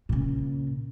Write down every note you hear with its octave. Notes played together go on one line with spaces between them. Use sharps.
A#2 C#3